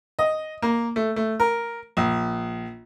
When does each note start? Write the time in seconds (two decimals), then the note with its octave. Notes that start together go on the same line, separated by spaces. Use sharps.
0.19 D#5
0.62 A#3
0.96 A3
1.16 A3
1.40 A#4
1.97 A#1